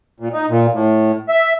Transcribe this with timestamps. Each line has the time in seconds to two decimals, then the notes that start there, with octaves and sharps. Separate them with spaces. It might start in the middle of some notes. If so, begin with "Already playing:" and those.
0.20 A#2
0.33 D#4
0.49 A#2
0.74 A2
1.29 E5